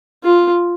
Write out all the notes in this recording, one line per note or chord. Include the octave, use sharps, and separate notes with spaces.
F4